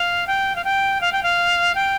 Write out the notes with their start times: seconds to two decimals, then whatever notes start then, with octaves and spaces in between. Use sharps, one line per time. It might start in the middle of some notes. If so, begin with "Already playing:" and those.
Already playing: F5
0.27 G5
0.56 F5
0.64 G5
1.01 F5
1.12 G5
1.23 F5
1.75 G5